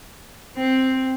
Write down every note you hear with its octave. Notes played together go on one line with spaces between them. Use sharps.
C4